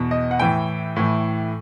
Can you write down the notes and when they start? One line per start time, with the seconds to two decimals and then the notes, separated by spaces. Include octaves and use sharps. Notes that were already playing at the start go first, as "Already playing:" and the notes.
Already playing: E2 B2
0.11 D#5
0.31 F#5
0.39 A2 E3 G5
0.96 A2 E3